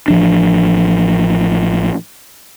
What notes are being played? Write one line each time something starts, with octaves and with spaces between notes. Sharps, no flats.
A1 F3 D4